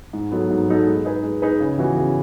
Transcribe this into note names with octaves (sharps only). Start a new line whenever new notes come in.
G#2
F#3 B3 D#4 A4
G#2
F#3 B3 D#4 A4
G#3
D#4 G#4 B4
G#3
D#4 G#4 B4
C#3
E3 B3 F#4
C#3